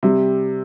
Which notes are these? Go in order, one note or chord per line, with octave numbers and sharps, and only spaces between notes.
C3 G3